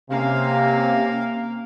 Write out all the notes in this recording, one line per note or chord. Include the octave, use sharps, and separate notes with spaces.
C3 A#3 C#4 F5